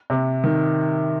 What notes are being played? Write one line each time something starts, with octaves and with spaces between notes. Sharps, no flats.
C3
D#3